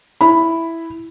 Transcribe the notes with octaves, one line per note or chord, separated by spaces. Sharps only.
E4 B5